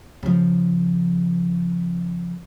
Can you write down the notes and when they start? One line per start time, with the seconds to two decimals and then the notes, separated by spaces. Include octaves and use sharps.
0.23 C#3 F3